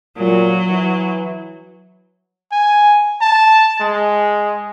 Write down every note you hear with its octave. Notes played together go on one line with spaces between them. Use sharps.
A#2 F#3
E3
G#5
A5
G#3